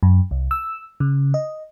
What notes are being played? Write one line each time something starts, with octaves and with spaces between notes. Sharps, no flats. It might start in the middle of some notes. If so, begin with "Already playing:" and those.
F#2
C2
E6
C#3
D#5